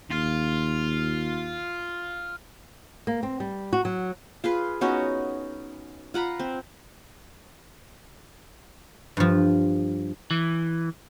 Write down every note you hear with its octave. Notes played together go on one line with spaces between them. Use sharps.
D#2 F4
A#3
C4
G3
F#4
F#3
F4 G#4 B4
B3 C#4 D#4 F#4
F4 F#5 A#5 B5
C4
G2 F3
E3